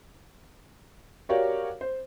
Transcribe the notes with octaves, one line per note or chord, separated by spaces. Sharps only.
F#4 G4 A#4 C#5 D5 F5
C5